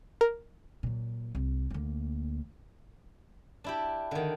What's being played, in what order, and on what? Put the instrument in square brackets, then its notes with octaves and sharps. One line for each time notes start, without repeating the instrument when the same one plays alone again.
[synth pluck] A#4
[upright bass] A#2 F#3
C2
D2 A#3
[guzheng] D4 E4 G4
D3 D#3